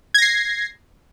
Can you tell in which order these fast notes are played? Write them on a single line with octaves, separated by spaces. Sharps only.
G#6 A#6 C7